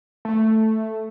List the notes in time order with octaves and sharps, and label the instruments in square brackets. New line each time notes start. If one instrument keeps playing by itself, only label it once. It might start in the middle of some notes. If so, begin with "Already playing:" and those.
[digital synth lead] A3